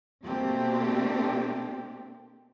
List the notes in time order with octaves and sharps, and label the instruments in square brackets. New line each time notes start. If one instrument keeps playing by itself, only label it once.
[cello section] B2 A3 A#3 C4 D4 G4